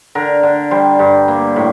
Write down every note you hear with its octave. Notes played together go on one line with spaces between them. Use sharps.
D3 A#4
D3
G3 C5
G2
A#3
A2